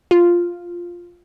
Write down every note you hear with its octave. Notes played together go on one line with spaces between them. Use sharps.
F4